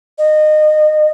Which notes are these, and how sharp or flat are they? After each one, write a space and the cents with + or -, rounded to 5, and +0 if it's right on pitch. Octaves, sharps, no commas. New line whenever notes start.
D#5 -25